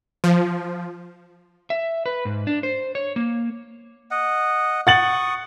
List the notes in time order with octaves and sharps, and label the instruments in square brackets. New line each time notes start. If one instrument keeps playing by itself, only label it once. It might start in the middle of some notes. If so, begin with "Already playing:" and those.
[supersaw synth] F3
[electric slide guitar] E5
B4
G#2
D4
C5
C#5
A#3
[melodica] D#5 F#5
[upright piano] F#5 A6 F#7 [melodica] C#6 D#6